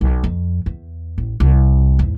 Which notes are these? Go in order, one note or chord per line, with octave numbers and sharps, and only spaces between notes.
B1
F2
E2
A1
C2
E2 G#2